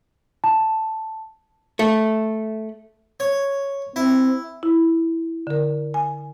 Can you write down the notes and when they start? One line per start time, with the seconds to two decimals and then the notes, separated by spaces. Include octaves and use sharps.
0.44 A5
1.79 A3
3.20 C#5
3.96 C4 E4
4.63 E4
5.47 D3 A#4
5.94 G#5